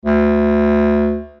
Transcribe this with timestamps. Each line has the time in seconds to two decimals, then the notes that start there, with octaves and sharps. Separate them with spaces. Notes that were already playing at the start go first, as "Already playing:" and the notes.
0.05 D2